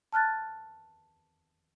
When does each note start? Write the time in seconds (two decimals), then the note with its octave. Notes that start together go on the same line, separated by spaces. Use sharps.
0.12 A5 F6 F#6 A6